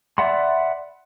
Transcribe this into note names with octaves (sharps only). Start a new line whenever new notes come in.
D5 E5 F#5 B5 C6